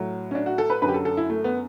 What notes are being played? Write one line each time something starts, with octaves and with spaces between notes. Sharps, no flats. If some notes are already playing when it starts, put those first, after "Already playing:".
Already playing: A2 F#3
C#4
D4
F#4
A4
B4
F#2 D3 F#3 B4
G4
A4
A4
E4
A3
B3